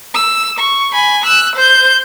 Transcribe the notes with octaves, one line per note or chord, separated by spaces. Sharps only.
E6
C#6
G#5 B5
E6 F#6
C5 G6